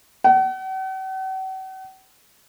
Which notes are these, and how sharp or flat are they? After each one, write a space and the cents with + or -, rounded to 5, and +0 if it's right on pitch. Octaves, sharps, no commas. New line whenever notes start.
F#5 +45